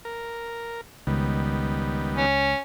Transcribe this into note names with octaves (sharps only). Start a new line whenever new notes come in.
A#4
C#2 D#3 G3 B3
C#4